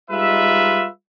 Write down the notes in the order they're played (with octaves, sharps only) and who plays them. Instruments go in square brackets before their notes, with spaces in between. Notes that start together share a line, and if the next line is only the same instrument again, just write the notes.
[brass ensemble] G3 G#3 D#4 F4 B4 E5